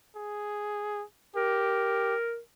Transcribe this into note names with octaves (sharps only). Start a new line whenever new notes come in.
G#4
G4 A#4